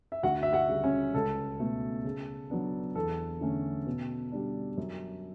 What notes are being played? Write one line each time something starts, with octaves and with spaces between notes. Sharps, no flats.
E5
D2 F#4 F#5
E5
F#4 F#5
C#3 G3
C#4 C#5
C#2 A4
B2 A3
C#3
F#3 B3 D4
E2 A4
D3 A3 C#4
B2
G3 D4
F#2